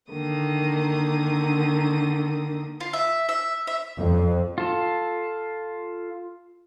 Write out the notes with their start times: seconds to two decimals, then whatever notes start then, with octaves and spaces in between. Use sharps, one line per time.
0.10 D3 D#3 A#3 D#6
2.80 F4
2.93 E5
3.29 E5
3.67 E5
3.97 F2
4.58 F4 A4